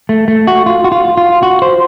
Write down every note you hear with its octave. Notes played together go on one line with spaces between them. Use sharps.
A3
A3
F#4
F4
F#4
F4
F4
F#4
C5